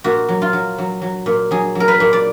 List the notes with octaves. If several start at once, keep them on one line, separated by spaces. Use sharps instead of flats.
A#2 F#4
F#3
F4
F#3
F#3
F#3
A#2
F#3 G#4
F#3
A#4
B4
A#2
D5